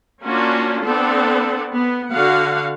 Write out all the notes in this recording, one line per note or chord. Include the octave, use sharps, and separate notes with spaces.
A#3 C#4 D4 F4 F#4
B3 C4 D4 A4
B3
D3 F#4 F5 F#5